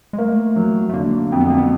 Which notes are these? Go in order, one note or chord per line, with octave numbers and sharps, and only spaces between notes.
G#3
A3 A#3
F#3
A3
D3 A#3
F2 C4
B3
A#3
B3